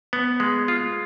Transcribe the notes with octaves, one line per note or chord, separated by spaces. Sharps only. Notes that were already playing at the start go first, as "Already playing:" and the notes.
B3
G#3
F4